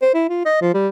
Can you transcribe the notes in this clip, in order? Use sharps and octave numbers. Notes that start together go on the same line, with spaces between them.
C5
E4
F4
D#5
F3
G3